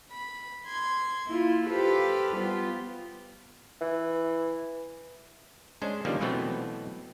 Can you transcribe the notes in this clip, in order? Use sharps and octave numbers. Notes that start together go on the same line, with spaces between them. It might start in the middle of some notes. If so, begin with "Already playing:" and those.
B5
C6 G#6
A#3 E4 F4
G4 A4 B4 C5 F5
G3 B3 F4 G4
E3
G#3 C#4 D4 C5
D3 D#3 F3 G3 A#3 C#4
B2 E3 F#3 A3 B3 C4